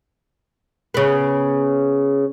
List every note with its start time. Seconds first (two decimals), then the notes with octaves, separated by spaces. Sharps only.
0.94 C#3 B3